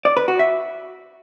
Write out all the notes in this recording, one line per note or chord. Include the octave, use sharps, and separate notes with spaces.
D5
B4
F#4
E5